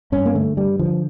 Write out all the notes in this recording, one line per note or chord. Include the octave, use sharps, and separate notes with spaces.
G2 C#4
A#3
D3 A3
G2 G3
D3 F3